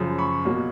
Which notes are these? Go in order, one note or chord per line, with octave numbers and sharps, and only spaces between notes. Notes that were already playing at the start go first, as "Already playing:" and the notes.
Already playing: F#2 C#3 F3
B5 C#6
B2 F#3 A#3